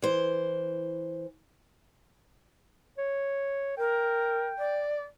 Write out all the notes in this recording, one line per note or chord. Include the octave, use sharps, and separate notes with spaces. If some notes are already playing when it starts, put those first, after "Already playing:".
E3 C5
C#5
A#4 G5
D5